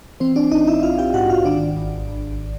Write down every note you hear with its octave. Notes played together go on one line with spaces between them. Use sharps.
E3 C4 C5
D4 D5
A#1 D#4 D#5
E4 E5
A#1 F4 F5
G4 G5
G#2 F#4 F#5
F4 F5
D#3 D4 D5
G#1
G#1